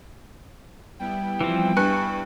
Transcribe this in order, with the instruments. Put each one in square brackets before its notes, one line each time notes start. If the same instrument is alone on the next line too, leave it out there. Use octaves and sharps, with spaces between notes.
[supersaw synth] G3 B3 E4 [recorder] G5
[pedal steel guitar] E3 F3 C4
[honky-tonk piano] G2 B4 C#7 [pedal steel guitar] G#5 C#6 F#6